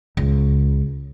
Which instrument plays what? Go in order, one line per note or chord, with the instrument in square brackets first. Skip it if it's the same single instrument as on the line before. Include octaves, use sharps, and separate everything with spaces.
[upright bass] C#2